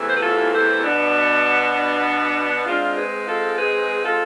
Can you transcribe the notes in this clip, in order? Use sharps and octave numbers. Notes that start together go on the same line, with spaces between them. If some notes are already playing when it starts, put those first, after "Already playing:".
Already playing: E2 C3 E3 A3
C5
B4
F4 A4
A4 C5
B2 B3 D4
D4
G#2 G#3 C4 D4 F4
G#4 B4
F4 A4
G#4 B4
F4 A4